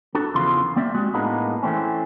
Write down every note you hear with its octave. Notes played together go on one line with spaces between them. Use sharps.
D4 F#4 A4
E2 C#3 E3 F3 F4 C6
A#3 C4 D5 E5
G3 G#3 F#4
A2 G#3 A#3 B3 D4 D#4
E3 A3 C4 C#4